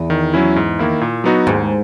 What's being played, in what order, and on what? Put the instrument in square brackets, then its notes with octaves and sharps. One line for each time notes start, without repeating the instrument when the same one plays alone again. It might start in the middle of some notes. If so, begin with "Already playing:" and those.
Already playing: [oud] E2
[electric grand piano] D#3
F#3 C#4 E4
G#2
D#3 A#3 E4
A#2
F#3 B3 D#4 F#4
[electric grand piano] D#2 [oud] G#2